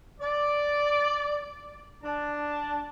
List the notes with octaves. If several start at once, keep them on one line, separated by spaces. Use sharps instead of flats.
D5
D4 A5